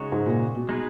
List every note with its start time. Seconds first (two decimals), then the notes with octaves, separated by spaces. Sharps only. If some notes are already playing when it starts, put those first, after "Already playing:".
Already playing: C#3 G#3 D#4 F#4 C#5
0.12 G#2
0.26 A#2
0.55 B2
0.69 G#3 D#4 G#4 B4